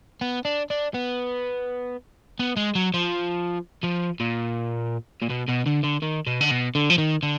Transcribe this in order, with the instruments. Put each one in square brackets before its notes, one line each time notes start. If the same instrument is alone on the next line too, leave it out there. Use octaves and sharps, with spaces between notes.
[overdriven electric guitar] B3
D4
D4
B3
B3
G#3
F#3
F3
F3
A#2
A#2
B2
B2
D3
D3
D#3
B2
D3
B2
D3
F3
D#3
D3